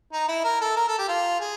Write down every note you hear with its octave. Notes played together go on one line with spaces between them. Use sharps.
D#4
E4
A#4
A4
A#4
A4
G4
F4
G#4